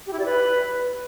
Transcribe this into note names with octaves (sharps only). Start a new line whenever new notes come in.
G4
E4
D5
B4